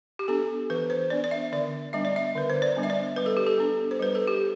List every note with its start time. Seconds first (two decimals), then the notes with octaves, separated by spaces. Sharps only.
0.19 G4
0.28 B3 D4 A4
0.70 E3 B4
0.90 C5
1.10 B3 D4 D5
1.24 D5
1.31 E5
1.52 D3 D5
1.93 G3 B3 D4 E5
2.05 D5
2.16 E5
2.35 D3 B4
2.50 C5
2.62 D5
2.76 G3 B3 D4
2.83 E5
2.90 D5
3.16 G3 B4
3.26 A4
3.37 G4
3.47 A4
3.58 B3 D4
3.91 C5
3.99 G3 B4
4.15 A4
4.27 G4